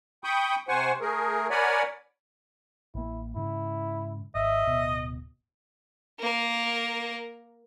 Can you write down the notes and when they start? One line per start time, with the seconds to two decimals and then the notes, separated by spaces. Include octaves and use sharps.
0.24 G5 B5 C#6 D#6 G6
0.68 C3 C5 F#5 G#5 C#6
1.01 A3 G#4 A#4
1.50 A#4 C#5 D5 F#5 G#5 B5
2.95 A1 A#3 E4
3.36 G#2 C#3 E4
4.35 G#1 D#5 E5
4.67 D1 B2
6.19 A#3 A#4